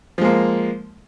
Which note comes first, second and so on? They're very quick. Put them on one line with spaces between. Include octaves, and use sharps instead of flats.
F3 G#3 A#3